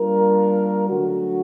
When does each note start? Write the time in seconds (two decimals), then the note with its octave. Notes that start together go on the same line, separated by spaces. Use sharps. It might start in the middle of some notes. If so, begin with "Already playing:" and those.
Already playing: G3 A#3 D4 F4 A#4
0.89 D3 F#3 A3 C#4 F#4